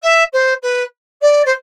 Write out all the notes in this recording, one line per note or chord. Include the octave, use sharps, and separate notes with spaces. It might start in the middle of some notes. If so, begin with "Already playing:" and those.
E5
C5
B4
D5
C5